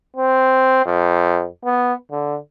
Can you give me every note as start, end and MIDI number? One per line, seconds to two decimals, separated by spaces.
0.16 0.84 60
0.86 1.46 41
1.65 1.93 59
2.11 2.37 50